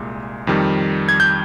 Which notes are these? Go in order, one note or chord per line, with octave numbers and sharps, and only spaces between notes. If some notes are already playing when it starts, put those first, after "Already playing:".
Already playing: C2 A#2 G#3
F2 D#3 G3
G#6
G6